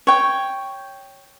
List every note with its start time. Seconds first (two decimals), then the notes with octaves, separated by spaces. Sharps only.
0.07 C#5 G5